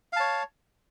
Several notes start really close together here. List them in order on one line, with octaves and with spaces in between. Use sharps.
F5 A5 C#5